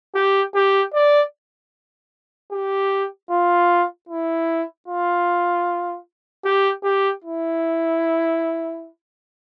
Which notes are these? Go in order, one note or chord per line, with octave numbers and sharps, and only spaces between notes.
G4
G4
D5
G4
F4
E4
F4
G4
G4
E4